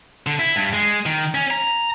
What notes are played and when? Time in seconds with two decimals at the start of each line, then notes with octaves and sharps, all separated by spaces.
0.27 D3
0.39 E4
0.56 G2
0.73 G#3
1.06 D#3
1.35 C#4
1.51 A#5